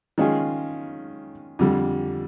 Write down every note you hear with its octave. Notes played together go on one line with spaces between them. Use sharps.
D#3 G#3 C#4 F4 G#4
F2 D3 G3